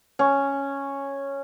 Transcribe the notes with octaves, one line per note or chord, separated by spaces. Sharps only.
C#4